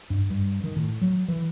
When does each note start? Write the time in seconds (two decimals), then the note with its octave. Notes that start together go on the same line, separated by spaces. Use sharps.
0.10 G2
0.30 G2
0.64 D#3
0.76 A2
1.01 F#3
1.28 E3